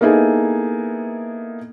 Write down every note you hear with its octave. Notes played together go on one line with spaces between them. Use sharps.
A#3 B3 D#4 E4 G#4 A4